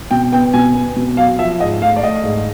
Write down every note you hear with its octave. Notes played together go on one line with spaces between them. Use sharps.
B2 G5
B3 G5
B2 G#5
B3
B2
F#3 F5
F3 E5
G#2 D#5
A3 F5
D5
A3 D#5
G#2